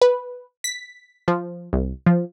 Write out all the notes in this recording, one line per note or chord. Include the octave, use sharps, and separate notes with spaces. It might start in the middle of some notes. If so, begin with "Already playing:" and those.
B4
B6
F3
C2
F3